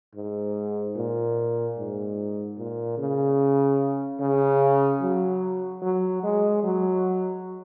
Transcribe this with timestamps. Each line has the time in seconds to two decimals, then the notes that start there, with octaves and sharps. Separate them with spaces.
0.15 G#2
0.96 A#2
1.77 G#2
2.57 A#2
2.98 C#3
4.20 C#3
5.01 F#3
5.82 F#3
6.23 G#3
6.63 F#3